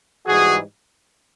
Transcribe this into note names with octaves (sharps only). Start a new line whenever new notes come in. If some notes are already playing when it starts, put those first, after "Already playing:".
G#2 E3 G3 F#4 G#4